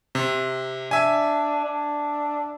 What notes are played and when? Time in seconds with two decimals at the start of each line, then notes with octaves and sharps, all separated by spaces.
0.15 C3
0.91 D4 E5 G#5
1.65 D4